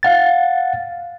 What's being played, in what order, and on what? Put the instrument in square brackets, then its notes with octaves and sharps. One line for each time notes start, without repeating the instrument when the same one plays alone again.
[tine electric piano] F5 F#5 A6